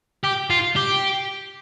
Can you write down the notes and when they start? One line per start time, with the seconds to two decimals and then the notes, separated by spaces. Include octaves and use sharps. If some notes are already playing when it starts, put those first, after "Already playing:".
0.23 G4
0.50 F4
0.76 G4